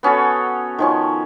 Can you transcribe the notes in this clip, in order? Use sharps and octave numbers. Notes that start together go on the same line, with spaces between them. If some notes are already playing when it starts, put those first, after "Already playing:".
B3 C#4 F#4 A4
D#3 F3 C#4